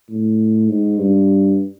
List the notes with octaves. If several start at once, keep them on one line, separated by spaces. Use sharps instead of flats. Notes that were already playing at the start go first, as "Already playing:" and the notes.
A2
G#2
G2